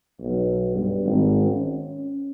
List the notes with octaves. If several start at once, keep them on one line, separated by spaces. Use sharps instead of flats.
B1
G2
G#1
C#4